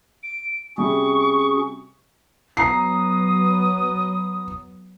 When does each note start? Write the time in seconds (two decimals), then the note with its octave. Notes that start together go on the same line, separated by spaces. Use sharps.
0.23 D7
0.78 C3 G3 C#4 F#4 G#4 C#6
2.57 F#3 B3 A#5 D#6 C7